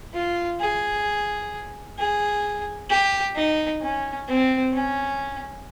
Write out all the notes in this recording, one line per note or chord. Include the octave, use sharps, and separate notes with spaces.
F4
G#4
G#4
G4
D#4
C#4
C4
C#4